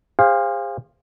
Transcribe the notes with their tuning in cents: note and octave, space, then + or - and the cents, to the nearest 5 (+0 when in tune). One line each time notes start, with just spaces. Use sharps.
G#4 -45 C5 +15 F5 +0